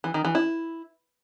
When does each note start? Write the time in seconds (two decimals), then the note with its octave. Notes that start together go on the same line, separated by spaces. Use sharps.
0.04 E3
0.14 D#3
0.25 E3
0.35 E4